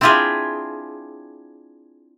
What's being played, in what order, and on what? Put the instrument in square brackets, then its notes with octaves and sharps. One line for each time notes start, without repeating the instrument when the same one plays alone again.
[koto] C4 D4 E4 F4 G4 G#4